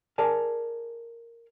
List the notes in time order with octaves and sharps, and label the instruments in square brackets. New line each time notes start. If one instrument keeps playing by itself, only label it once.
[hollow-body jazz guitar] G#4 A#4 D5 G#5 A5